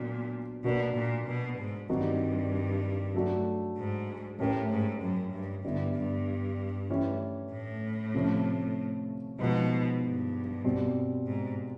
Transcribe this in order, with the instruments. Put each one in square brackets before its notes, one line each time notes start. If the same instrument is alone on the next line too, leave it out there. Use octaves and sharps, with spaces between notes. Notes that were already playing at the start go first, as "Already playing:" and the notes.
Already playing: [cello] A#2 [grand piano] F#3 B3 D4
[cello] B2 [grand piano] A#3 D4 F#4
[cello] A#2
B2
G#2
[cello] G2 [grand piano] D#3 G3 C4 D#4 F#4
[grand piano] F#3 A3 D4 F#4 A4
[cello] G#2
[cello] A2 [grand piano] A3 C#4 E4 G4 A#4
[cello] G#2
F#2
G2
[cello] G2 [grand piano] D3 G3 B3 E4
[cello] G2
[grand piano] E3 A3 C#4 E4 G4
[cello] A2
[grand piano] C3 F3 A3 C#4
[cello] B2 [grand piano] F3 G#3 B3 D#4
[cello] G2
[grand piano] B2 G3 C4
[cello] G#2